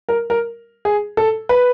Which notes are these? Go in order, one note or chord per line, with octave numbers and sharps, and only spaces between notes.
A#4
A#4
G#4
A4
B4